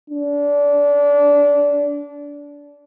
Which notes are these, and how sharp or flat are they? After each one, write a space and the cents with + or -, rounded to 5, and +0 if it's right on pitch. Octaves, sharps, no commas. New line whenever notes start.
D4 -25